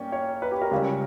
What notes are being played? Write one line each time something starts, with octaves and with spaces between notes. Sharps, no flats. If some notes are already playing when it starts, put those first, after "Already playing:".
Already playing: G2 A#3 C#4 D5 G5
C#5
B4
G4
A#4
C#2 C#3 G3 C#4